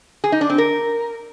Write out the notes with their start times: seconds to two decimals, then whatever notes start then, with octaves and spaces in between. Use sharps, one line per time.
0.24 G#4
0.32 D#4
0.41 D4
0.50 C4
0.58 A#4